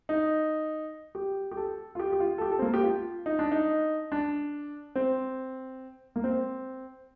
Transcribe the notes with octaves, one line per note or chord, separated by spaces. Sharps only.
D#4
G4
G4
A4
F4
G4
G4
F4
A4
G4
A4
C4
A#3
G4
F4
D#4
D4
D#4
D4
C4
A#3
C4